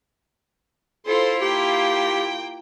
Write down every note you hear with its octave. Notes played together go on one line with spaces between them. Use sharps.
E4 F4 A4 C5
A#3 G4 G5